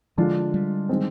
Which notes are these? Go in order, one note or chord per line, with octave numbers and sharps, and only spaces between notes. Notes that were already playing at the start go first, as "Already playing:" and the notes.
D3 F3 G#3 D4 F4
G3
D#3 G#3 C4